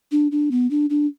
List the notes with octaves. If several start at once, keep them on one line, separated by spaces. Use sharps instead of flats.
D4
D4
B3
D4
D4